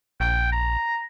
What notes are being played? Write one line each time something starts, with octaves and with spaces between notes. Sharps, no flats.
A#1 G5
A#5